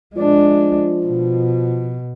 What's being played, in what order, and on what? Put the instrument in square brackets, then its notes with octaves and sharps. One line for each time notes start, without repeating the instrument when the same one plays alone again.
[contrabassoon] F3 [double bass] G#3 D4
[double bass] B2